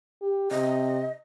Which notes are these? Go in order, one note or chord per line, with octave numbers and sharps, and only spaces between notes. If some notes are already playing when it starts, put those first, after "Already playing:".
G4
C3 D#5